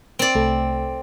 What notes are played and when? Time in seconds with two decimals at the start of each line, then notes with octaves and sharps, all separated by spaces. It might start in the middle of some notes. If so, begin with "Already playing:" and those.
0.19 C4 D5
0.35 C2 A3 A4